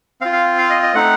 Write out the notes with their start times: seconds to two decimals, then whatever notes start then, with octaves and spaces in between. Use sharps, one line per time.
0.21 C4 F5
0.25 F4
0.33 F5
0.58 F5
0.70 D#5
0.83 D#5
0.95 A3 C4 D#4 F#5